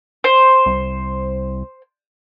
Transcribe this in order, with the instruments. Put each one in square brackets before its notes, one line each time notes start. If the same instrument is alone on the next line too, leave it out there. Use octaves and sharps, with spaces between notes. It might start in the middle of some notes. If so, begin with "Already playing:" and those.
[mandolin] C5
[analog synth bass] C2